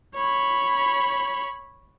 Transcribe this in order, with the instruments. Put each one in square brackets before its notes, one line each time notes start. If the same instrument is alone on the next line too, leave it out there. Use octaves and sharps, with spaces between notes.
[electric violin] C#5 B5